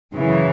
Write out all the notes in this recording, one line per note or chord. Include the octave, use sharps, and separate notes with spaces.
F#2 C#3 E3